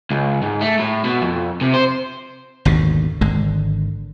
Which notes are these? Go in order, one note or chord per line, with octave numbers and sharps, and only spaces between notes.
C#2
G#2
A3
A2
B2
F2
C3
C5
G#1 D#2 B2 D3
G#1 D3 G#3